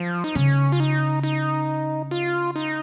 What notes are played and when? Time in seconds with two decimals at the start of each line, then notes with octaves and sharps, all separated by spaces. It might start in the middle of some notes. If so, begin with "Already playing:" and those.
Already playing: F3
0.24 D#4
0.35 C#3 C#4
0.72 F4
0.80 D#4
1.23 D#4
2.11 F4
2.56 D#4